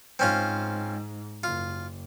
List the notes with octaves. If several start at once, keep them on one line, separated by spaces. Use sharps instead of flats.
G#2 C4 C#4 F4
F#1 F4